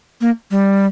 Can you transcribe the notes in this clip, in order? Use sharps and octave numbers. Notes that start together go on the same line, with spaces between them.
A#3
G3